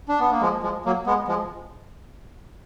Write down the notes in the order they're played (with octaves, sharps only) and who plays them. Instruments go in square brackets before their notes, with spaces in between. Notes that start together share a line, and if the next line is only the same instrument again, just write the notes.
[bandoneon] D4
B3
A#3
F3 G#3
F3 G#3
F#3 A#3
G#3 B3
F3 G#3